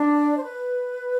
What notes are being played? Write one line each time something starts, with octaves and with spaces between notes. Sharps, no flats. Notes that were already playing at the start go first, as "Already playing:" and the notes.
Already playing: D4 D5
C5
B4